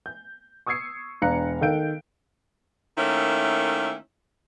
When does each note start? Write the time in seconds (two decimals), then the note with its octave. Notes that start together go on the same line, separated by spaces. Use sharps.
0.06 G6
0.67 C#6 D#6 E6 G#6 C7 C#7
1.22 E1 D4 F5 A#5 F#6 C#7
1.61 D#3 A4 F5 G6 D7
2.98 D#3 A3 A#3 C#4 E4